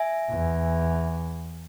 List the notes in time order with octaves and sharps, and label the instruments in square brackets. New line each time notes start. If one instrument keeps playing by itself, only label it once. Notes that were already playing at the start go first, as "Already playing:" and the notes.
Already playing: [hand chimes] E5 G#5
[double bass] E2